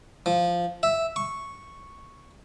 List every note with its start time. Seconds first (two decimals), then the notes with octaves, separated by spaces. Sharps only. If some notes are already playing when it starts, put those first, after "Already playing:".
0.26 F3
0.83 E5
1.16 C#6